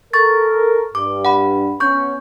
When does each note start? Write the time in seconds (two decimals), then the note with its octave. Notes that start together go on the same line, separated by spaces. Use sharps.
0.13 A4 A#4 C#6 A6
0.95 G2 D6
1.25 F#5 B5
1.80 B3 C#4 C#6 G6